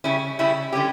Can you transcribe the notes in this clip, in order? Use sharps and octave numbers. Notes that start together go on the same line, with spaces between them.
C#3 G3 C#4 E4
C#3 G3 C#4 E4
D3 G3 C#4 G4